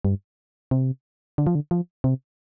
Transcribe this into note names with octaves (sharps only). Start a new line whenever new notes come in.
G2
C3
D3
F3
D3
F3
C3